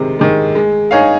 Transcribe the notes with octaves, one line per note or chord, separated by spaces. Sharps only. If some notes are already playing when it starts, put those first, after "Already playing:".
Already playing: C3 D#3 G#3
D#3 G#3
G#3
D#4 G#4 C#5 F5